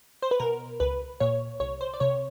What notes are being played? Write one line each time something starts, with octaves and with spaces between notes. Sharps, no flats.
C5
B4
B2 A#4
C#2 B4
A#2 C#5
C2 C#5
C5
D5
C3 C#5